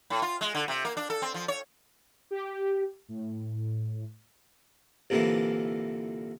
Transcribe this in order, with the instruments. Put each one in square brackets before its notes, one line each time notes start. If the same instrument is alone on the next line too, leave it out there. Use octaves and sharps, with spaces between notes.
[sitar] A2
F4
G#3
D3
C3
A#3
D4
A4
C4
F3
C#5
[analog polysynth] G4
A2
[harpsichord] C2 A#2 D3 E3 A#3